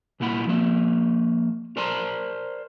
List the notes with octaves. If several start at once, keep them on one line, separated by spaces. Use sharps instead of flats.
C2 A#2 E4 F#5 B5
F3 A#3 E5
A#4 C5 D5 A5 A#5 C6